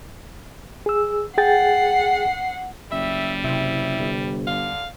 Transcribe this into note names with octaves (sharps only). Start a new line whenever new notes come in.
G#4 E6
G#4 F#5 G5 A6 C7
F#1 G3 E5
C3 E4
G1
D3 F5